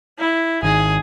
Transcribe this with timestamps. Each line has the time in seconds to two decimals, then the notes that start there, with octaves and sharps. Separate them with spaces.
0.18 E4
0.63 G#1 D#3 G#4